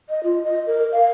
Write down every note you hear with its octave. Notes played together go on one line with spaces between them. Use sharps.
D#5
F4
D#5
A#4
F5